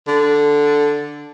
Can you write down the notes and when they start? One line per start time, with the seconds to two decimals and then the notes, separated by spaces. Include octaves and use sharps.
0.08 D3